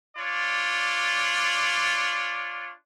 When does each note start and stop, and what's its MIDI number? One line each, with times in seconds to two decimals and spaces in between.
0.17 2.73 62
0.17 2.73 65
0.17 2.73 73
0.17 2.73 74